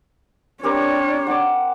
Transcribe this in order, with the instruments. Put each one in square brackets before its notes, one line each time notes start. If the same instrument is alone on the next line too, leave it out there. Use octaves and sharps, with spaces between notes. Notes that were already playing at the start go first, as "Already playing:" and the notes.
[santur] C4 G4 A#4 [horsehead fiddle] D4 C#5
[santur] F#5 D6